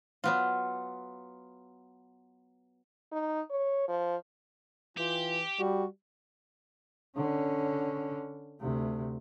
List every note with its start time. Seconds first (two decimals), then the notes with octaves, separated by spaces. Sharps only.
0.24 F#3 B3 F4
3.12 D#4
3.50 C#5
3.88 F3
4.97 E3 F4 G4
5.59 G3 F#4
7.16 D3 C#4
8.60 D2 C3